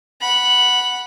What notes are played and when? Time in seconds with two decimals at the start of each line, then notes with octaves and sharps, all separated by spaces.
0.21 F#5 B5